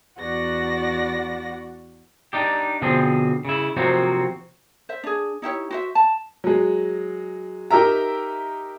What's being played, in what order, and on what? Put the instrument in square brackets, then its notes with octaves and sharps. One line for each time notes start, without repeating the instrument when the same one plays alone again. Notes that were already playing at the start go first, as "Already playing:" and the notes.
[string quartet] E2 B3 F#4 D5 F#5 A#6
[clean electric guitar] D4 D#4 G4
B2 D3 F3 C4 G#4
C#3 E4
C3 F3 F#3 A#3 C4 F#4
[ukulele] C5 E5
D4 G#4
D#4 E4 G4 C#5
F#4 C5 E5
A5
[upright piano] F#3 G#3
D#4 G4 A#4 E5 A#5